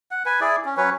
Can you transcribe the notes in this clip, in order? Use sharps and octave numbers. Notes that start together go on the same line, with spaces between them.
F#5
B4 G#5
E4 G#4 D5
C#4
F#3 C#4 B4 C#5